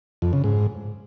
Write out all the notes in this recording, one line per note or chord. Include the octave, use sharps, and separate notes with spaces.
F2
C#3
G#2